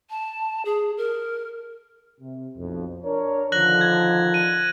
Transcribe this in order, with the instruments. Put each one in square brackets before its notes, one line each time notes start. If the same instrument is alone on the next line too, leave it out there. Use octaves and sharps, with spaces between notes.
[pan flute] A5
G#4
A#4
[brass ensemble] C3
B1 F2
D4 A#4 C#5
[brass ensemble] D3 D#3 F3 [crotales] F#6 A#6 F#7
[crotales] G#6
D#7